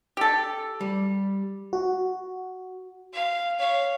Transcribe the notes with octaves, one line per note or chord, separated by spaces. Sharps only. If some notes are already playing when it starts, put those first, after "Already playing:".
G4 A4
G3
F#4
F5
C#5 F5